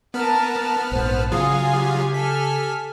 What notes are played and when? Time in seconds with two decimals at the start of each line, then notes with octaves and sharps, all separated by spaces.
0.14 B3 A#4 B4 A5 F6
0.92 A#1 G#2 C5 A5
1.32 C#3 F#3 F4 G#4 F5 G#5 D#6
1.75 G4
2.14 A4 G#5 F6 B6